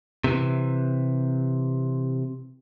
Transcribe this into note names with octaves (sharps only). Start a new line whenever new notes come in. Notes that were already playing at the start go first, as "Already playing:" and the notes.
C3 E3